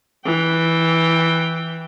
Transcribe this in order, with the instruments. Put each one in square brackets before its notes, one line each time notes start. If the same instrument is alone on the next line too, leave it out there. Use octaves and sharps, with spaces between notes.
[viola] E3 G5